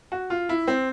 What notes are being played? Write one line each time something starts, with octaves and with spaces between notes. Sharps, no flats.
F#4
F4
E4
C4